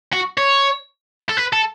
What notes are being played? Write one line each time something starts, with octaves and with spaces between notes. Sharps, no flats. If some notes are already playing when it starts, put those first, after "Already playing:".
F#4
C#5
A4
B4
A4